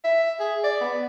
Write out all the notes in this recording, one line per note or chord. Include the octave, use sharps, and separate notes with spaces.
E5
G#4
D5
B3